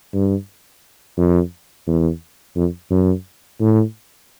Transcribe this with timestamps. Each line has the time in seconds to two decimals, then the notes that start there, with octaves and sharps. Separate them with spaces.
0.14 G2
1.18 F2
1.87 E2
2.56 F2
2.91 F#2
3.60 A2